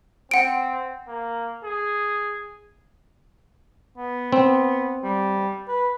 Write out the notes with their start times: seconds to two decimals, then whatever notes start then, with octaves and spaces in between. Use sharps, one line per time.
0.31 C4 F#5 D7
1.08 A#3
1.65 G#4
3.98 B3
4.33 C4
5.04 G3
5.68 B4